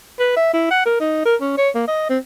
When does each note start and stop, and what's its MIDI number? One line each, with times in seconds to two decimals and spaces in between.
0.19 0.33 71
0.36 0.50 76
0.53 0.66 64
0.71 0.85 78
0.86 0.96 70
1.00 1.24 63
1.25 1.35 70
1.41 1.54 61
1.58 1.69 73
1.75 1.84 58
1.87 2.08 75
2.09 2.18 60